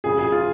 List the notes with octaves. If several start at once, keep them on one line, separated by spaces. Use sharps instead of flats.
C#3 F3 G#4
G#4
F4